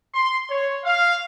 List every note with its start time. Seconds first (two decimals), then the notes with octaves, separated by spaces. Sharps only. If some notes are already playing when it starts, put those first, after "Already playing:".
0.14 C6
0.50 C#5
0.85 F5